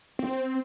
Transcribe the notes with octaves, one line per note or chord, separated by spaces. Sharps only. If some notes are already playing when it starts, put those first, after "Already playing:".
C4